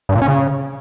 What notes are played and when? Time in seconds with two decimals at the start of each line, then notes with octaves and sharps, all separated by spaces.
0.09 G2
0.15 A#2
0.22 C#4
0.28 C#3